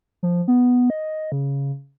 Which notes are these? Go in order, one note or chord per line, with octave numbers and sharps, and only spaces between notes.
F3
B3
D#5
C#3